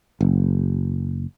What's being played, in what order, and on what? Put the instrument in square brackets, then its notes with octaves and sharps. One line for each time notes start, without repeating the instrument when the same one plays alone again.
[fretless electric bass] F#1